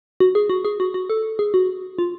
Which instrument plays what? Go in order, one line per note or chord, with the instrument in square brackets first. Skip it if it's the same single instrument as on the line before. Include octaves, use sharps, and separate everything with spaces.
[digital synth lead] F#4
G#4
F#4
G#4
F#4
F#4
A4
G#4
F#4
F4